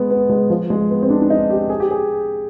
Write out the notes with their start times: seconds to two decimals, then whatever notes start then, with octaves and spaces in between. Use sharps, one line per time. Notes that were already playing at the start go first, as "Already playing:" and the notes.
Already playing: G#3 B3
0.11 B3
0.30 G#3
0.50 F3
0.70 G#3
0.90 B3
1.03 C4
1.10 D4
1.22 D4
1.30 D#4
1.50 G4
1.69 G#4
1.80 G4
1.91 G#4